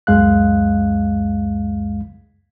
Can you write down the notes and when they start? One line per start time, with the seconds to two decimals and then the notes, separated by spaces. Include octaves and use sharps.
0.07 C#2 F#2 G#3 F5 F#6